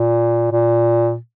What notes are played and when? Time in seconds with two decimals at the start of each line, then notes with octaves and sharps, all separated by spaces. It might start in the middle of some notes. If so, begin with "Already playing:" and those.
Already playing: A#2
0.52 A#2